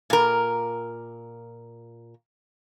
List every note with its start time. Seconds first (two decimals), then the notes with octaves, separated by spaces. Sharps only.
0.10 A#2 A#4